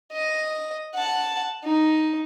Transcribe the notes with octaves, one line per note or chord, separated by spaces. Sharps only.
D#5
F#5 A5
D#4